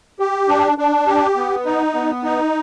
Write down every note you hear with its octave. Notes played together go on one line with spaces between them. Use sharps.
G4
D4
D4
G4
B3
D#4
B3
D#4